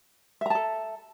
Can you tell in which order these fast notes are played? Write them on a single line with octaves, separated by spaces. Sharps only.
E5 A#5 A5 A4